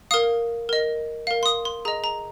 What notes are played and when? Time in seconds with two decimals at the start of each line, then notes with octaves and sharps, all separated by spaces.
0.11 A#4 F5 D#6
0.69 A#4 D#5
1.27 A#4 F5
1.43 C6
1.46 D#6
1.65 C6
1.85 G#4 D#5 A#5
2.04 A#5